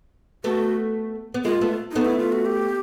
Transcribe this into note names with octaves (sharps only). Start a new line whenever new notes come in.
A3 B3 F#4
B3
G#3 A#3 F4
A3 B3
A3 B3 D#4
E4
F4
F#4
G4